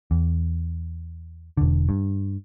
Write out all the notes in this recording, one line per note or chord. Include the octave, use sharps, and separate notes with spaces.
E2
E1 D3
G2